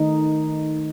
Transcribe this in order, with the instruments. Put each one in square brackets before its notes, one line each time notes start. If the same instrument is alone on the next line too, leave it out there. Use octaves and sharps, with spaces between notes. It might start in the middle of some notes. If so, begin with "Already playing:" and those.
Already playing: [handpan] D#3 A3 D#4